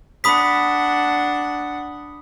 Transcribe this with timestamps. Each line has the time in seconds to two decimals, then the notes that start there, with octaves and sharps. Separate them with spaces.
0.24 D4 F#5 B5 D#6 B6